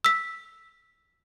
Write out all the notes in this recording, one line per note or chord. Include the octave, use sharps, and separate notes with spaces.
E6 B6